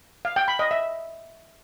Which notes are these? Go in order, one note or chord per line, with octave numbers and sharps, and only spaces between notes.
F5
G5
B5
D#5
E5